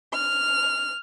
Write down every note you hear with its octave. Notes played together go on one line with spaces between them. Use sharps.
F6